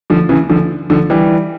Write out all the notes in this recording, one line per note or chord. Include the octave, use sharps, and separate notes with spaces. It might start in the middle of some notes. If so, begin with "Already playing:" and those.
D3 F3
C#3 E3
D3 F3
D3 F3
E3 G3